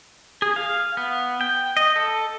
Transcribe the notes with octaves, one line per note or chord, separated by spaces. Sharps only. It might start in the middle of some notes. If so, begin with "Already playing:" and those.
G#4
F5
B3
G5
D#5
A4